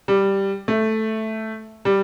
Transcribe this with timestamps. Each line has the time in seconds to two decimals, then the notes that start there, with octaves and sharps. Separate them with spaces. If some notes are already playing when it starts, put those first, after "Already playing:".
0.08 G3
0.68 A3
1.85 G3